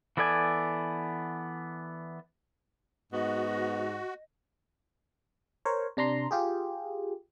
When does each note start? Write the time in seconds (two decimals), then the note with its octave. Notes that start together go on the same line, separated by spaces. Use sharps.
0.17 E3 B3 A4 D5 G#5
3.13 G#2 B3 F#4 D#5
5.65 A#4 C5 C#5
5.97 C3 D4 A#5 C6
6.31 F4 G4 G#4